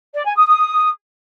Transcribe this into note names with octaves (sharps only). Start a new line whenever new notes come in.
D5
G#5
D#6
D#6